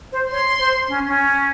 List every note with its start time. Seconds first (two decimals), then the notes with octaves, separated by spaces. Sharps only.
0.12 C5
0.31 C#5 C6
0.59 C5
0.88 C#4
1.08 C#4